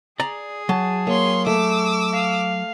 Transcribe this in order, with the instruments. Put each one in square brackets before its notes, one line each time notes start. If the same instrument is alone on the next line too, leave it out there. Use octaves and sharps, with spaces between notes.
[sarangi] G#4 [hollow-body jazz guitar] D5 A#5
[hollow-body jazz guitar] F#3 [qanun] A5
[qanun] A#3 [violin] C#5 C6
[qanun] A3 [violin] D6 E6
[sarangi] F5